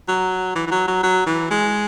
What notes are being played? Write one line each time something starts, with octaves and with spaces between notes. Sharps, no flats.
F#3
E3
E3
F#3
F#3
F#3
E3
G#3